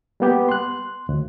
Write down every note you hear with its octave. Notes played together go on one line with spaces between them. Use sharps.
G3 A#3 B3 G4
C6 F#6
D2